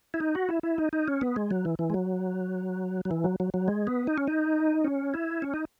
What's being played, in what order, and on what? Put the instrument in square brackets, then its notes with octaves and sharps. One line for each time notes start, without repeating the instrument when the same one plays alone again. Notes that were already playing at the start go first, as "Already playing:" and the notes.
[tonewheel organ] E4
D#4
F#4
E4
E4
D#4
D#4
C#4
B3
G#3
F#3
E3
E3
G#3
F#3
F#3
E3
F#3
F#3
F#3
G#3
B3
D#4
C#4
D#4
C#4
E4
C#4
D#4